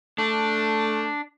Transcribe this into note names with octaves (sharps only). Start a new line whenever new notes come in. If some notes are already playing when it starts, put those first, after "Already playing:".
A3 D4